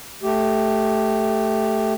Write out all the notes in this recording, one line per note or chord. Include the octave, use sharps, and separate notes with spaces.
A3 G4